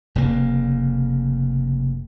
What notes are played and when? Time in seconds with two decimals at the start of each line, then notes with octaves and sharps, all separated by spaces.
0.15 F1 C#3 A#3